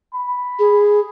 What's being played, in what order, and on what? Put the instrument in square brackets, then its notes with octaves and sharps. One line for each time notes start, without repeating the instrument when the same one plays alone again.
[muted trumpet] B5
[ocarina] G#4